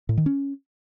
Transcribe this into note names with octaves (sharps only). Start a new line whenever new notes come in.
A2
D#3
C#4